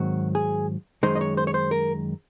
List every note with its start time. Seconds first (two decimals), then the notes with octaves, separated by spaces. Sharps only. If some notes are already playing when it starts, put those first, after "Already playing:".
Already playing: G#2 D#3 F#3 C4 F#4
0.35 G#4
1.03 F#2 D#3 G#3 D#4 C5
1.15 D#5
1.21 C#5
1.37 C5
1.47 C#5
1.54 C5
1.71 A#4